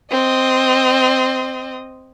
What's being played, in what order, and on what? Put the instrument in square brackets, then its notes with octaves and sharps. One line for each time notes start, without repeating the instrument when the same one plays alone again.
[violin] C4 D#5